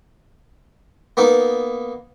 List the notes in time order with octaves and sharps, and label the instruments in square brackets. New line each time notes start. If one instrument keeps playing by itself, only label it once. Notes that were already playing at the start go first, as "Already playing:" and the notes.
[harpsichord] A#3 B3 D#4